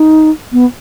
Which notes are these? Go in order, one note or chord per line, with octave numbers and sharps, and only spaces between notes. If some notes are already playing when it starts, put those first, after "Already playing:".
Already playing: D#4
B3